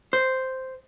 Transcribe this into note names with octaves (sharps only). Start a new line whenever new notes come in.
C5